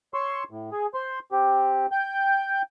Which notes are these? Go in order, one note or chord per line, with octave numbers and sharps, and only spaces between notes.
C#5 C6 C#6 E6
A2
G#4
C5 C6
C4 G4
G5 G6